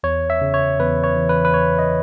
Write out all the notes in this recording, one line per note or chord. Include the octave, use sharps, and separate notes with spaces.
E2 C#5
E5
C#3
C#5
E2 B4
C#5
E3
B4
B4
E2 C#5
D#5